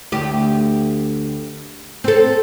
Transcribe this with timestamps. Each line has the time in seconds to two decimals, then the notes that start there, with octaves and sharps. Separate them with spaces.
0.12 D2 G4
2.04 C4 A4